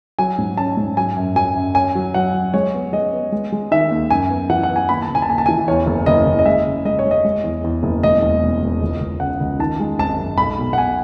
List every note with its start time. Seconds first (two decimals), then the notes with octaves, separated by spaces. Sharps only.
0.19 F#3 G#5
0.38 G#2
0.57 C#4 A5
0.77 G#2
0.97 F#3 G#5
1.16 F#2
1.36 F#3 G#5
1.55 F#2
1.75 C#4 G#5
1.95 F#3
2.14 F#3 F#5
2.34 F#3
2.54 G#3 C#5
2.74 B3
2.93 G#3 D#5
3.13 B3
3.32 G#3
3.52 G#3
3.71 D#3 E5
3.91 D#2
4.10 F#2 G#5
4.30 B3
4.50 E3 F#5
4.63 F#5
4.69 B3
4.76 G#5
4.89 D#2 B5
5.02 A5
5.09 C#3
5.15 G#5
5.22 A5
5.28 D#2 G#5
5.38 A5
5.46 E3 G#5
5.68 E2 C#5
5.87 F#1
6.06 F#1 D#5
6.26 F#1
6.39 D#5
6.46 G#3 E5
6.66 C#3
6.85 G#3 D#5
6.99 C#5
7.05 G#3
7.11 D#5
7.25 G#3
7.44 E2
7.64 E2
7.83 F#1
8.03 E1 D#5
8.22 E2
8.43 E1
8.62 E1
8.82 C#2
9.00 C#2
9.20 C#3 F#5
9.40 C#2
9.59 D#3 A5
9.80 G#3
9.99 G#1 A5
10.19 F#2
10.38 B1 B5
10.58 B2
10.73 F#5
10.78 B2 G#5